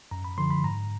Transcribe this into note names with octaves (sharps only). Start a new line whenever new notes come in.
F#2 A#5
B5
D3 F3 C6
B5
G#2 A#5